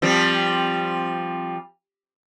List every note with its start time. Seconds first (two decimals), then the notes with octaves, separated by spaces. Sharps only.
0.02 F3 G3 C4